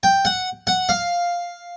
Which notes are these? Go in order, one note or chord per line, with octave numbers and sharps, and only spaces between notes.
G5
F#5
F#5
F5